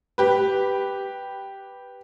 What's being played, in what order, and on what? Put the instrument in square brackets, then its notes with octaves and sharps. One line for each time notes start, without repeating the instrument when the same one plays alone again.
[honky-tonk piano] G4 B4